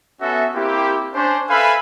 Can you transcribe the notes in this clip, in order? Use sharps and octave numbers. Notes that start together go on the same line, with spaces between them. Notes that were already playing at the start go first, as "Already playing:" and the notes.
B3 C#4 F#4 A4 E5
A#3 C4 E4 G4
C#4 D4 C5
A4 B4 E5 F5 G#5 B5